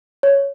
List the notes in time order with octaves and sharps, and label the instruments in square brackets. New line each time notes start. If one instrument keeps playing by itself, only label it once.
[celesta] C#5